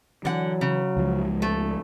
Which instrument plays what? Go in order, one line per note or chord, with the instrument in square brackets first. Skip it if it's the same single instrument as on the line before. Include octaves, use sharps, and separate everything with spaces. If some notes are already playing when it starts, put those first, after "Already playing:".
[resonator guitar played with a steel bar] D3 F#5 [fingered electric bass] E3 [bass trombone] F#3
[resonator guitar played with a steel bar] C#3
[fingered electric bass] C#2 F3 G#3
[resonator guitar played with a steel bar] A3